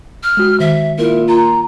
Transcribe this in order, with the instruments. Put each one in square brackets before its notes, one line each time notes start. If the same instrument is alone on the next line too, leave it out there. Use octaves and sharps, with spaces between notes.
[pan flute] F6
[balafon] G#3 F#4
[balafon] D#3 [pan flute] E5
[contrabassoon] A#2 [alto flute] E4 [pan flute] A#4
[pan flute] F4 [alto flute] A#5